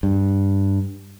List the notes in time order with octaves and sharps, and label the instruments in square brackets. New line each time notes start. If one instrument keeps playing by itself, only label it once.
[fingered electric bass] G2